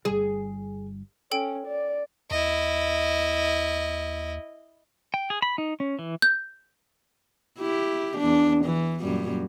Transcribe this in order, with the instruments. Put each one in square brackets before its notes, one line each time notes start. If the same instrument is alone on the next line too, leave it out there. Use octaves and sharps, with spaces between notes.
[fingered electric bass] G1 G3 [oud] G#4
[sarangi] C#4 [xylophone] A4 G5 D7
[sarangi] D5
[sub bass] D#2 [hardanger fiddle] E4 D#5
[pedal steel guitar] G5
G#4
B5
D#4
C#4
E3
[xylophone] G6
[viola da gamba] E4 G4
E2 D4
E3
F#2 A#2 G3